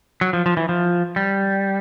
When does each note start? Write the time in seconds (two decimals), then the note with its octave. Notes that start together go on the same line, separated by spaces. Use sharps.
0.21 F#3
0.33 F3
0.46 F3
0.57 E3
0.69 F3
1.16 G3